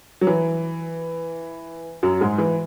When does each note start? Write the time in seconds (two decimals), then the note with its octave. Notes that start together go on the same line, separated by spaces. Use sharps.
0.21 F#3
0.27 E3
2.03 F#2 F#3
2.21 G#2 G#3
2.38 E3